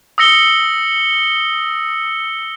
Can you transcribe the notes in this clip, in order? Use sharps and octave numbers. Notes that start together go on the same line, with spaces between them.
D#6 E6 A#6 C#7 G7